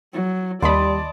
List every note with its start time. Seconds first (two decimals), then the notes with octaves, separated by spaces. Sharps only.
0.13 F#3
0.62 D#2 G3 D5 D#5 A5 B5 C6